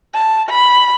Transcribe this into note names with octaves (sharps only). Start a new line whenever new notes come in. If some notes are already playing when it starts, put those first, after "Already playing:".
A5
B5